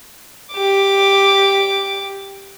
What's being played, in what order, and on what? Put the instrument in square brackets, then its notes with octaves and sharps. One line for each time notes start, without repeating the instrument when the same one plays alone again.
[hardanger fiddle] G4 D6